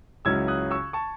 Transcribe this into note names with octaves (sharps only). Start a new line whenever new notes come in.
C#2 C#3 F#3 C#4 E4 E6 G#6
D#6 F#6
C#6 E6
A5 C#6